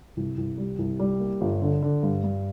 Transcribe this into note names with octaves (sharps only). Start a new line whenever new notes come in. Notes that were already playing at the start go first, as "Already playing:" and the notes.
C2
C2
G3
C2
G3
A#3
G1
D3
D3
G2
G2